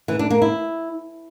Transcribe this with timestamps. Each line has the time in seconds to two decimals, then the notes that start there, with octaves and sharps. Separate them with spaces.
0.08 E3
0.19 D4
0.30 A#3
0.42 E4